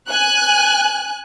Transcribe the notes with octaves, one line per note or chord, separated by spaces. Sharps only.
G#5 F#6